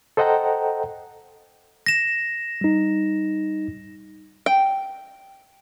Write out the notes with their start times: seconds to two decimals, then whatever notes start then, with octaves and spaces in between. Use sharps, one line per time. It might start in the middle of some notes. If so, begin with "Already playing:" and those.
0.17 A4 C5 D#5 F#5 G5 A#5
1.86 A#6 E7
2.61 G3 D#4
4.46 G5